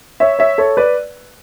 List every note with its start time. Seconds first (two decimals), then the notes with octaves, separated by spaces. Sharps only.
0.20 C#5 E5
0.39 C#5 E5
0.58 A4 C#5
0.77 B4 D5